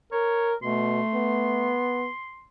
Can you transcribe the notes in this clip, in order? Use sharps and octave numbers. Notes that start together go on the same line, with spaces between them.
A#4 C#5
B2 A3 C6
B3